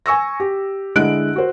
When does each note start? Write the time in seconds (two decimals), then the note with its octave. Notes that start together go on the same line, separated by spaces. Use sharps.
0.06 G#5 C#6 E6 A#6
0.40 G4
0.95 D3 G#3 E4 D#5 F#6 D7
1.36 F#4 C5